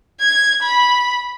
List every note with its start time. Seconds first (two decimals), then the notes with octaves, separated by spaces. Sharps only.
0.20 G#6
0.62 B5